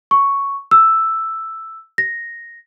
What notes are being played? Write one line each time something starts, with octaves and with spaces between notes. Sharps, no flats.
C#6
E6
A#6